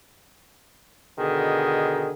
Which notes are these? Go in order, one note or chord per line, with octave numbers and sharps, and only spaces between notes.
B2 D3 D#3 G#4